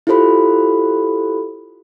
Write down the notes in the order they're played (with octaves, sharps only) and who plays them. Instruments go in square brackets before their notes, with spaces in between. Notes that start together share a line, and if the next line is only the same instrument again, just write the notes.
[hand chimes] E4 F4 G4 A4 C5 B5